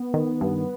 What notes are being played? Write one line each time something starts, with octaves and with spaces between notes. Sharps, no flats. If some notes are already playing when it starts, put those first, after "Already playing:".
Already playing: B3
D#3
G2